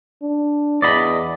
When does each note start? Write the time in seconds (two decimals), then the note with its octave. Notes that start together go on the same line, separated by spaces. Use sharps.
0.23 D4
0.82 E2 D5 D#5 B5